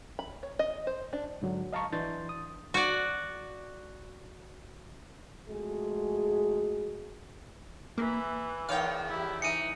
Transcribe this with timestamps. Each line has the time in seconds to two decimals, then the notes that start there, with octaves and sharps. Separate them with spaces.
0.19 B5
0.43 C#5
0.59 D#5
0.87 C5
1.13 D4
1.42 G#2 D3 F#3
1.73 D#5 F5 A5 A#5 C#6
1.93 E3 D4 C6 G6 A6
2.29 D#6
2.74 F#4 D5
5.49 F2 G#3 A3 F#4 G#4
7.98 E3 A#3
8.69 E2 D#3 C#5 F5 G5
9.09 E4 G4
9.42 E3 D#4 C#7 D#7